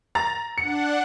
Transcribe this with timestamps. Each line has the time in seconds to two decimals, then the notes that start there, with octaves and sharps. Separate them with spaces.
0.15 A#5 A6
0.58 D4 F#5 C#7